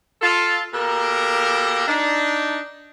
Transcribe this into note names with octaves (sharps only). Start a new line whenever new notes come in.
F4 A4
B2 A#3 G4 A4 A#4
D4 D#4